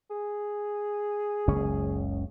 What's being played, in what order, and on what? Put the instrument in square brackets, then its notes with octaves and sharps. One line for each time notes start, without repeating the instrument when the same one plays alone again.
[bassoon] G#4
[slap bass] F#1 C#2 C#4